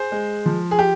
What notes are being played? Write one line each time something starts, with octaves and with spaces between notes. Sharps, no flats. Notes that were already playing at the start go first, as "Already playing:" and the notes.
Already playing: G#4 C5
G#3
F3
G#4
G4